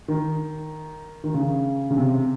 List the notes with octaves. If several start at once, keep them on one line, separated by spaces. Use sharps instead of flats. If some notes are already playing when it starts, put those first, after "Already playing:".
D#3
D#3
C#3
C#3
C3